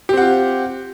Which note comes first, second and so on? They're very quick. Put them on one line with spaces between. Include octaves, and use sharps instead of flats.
G4 C4 F#5 F4